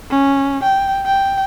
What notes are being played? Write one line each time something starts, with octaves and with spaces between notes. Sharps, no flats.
C#4
G5
G5